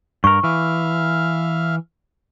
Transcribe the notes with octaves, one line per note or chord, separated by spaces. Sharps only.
G2 A#4 C#6
E3 E5 F5 F6